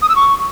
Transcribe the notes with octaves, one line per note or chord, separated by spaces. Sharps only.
D#6
E6
C#6